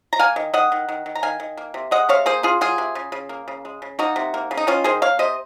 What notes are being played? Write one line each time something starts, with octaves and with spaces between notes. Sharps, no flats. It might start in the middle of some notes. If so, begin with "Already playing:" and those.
A#5
A#3 F5 G#5
D#3
D#3 D#5 F#5
D#3
D#3
D#3
A#5
D#3 F5 G#5
D#3
A#3
C3
G#3 D#5 F#5
C3 C#5 F5
A#3 G#4 C5
C#3 F4 G#4
F#3 F4 G#4
C3
C#3
C#3
A#3
C#3
G#3
C#3
A#3 D#4 F#4
C3
A#3
C#3
D#4
D#3 C#4 F4
D#3 G#4 C5
A#3 C#5 F5
C3 C5 D#5